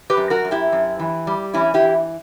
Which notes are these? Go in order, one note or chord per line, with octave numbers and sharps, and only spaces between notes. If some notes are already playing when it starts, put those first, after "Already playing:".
G4 B4
F#2
F#4 A#4
F#2
E4 G4
F#2
E3
G3
E3 C#4 E4
E4 G4
E3